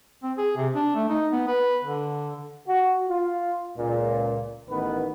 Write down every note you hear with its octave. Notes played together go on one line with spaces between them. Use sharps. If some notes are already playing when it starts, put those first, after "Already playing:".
C4
G#4
C3
D4
A3
D#4
B3
B4
D3
F#4
F4
C#2 A#2
A1 D#3 B3 B4